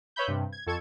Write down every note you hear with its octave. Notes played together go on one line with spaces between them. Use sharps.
B4 C#5 E5 B5 G6
G2 C3
G#6
F2 A4 C#6 G#6